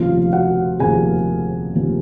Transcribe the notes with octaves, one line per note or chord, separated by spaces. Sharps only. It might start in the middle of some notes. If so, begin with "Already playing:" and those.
Already playing: F1 D#2 C#3 F3 A#3 F4 F5
F#4 F#5
F1 D#2 C#3 F3 A#3 G#4 G#5
F1 D#2 C#3 F3 A#3